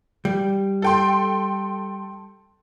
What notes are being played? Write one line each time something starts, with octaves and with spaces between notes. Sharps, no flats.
G3
A4 G5 C6